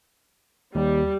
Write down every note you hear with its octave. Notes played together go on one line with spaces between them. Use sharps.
D#2 G3